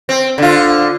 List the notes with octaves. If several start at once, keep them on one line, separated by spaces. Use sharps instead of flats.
C4
D3 F4